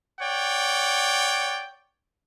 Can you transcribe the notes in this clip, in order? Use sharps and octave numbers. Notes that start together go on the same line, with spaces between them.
C#5 D5 F#5 G5